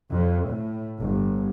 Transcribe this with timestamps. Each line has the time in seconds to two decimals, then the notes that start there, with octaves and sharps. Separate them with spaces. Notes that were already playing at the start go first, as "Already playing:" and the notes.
0.10 F2
0.48 A2
1.01 G1